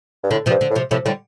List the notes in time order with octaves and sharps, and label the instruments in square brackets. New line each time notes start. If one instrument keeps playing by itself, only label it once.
[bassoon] G2
[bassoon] A2 [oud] D3
[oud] C3 F3
[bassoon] G2
[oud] D3
[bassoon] A2
[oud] C3 F3
[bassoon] A2 [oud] C3 F3
[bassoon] A2 [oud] D3 G3